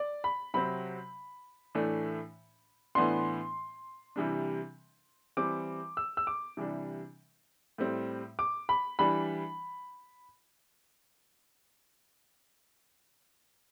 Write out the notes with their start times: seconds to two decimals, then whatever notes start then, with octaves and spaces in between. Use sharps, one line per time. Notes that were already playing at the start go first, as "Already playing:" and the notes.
Already playing: D5
0.24 B5
0.54 C3 F#3 C4 B5
1.75 A2 E3 A3 D4
2.95 A2 E3 B3 D4 C6
4.16 C3 E3 G3 D4
5.37 E3 G3 C4 D6
5.97 E6
6.17 E6
6.27 D6
6.57 C3 E3 G3 D4
7.78 A2 G3 C4
8.39 D6
8.69 B5
8.99 E3 G3 D4 B5